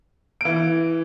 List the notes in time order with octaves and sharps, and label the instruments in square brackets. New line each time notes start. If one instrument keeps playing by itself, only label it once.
[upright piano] E3 D7